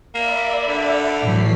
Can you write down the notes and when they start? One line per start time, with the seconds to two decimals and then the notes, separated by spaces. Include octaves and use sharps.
0.15 A#3 D5 E5 B5
0.67 D3
1.23 A2 E3 F#3 B6 C7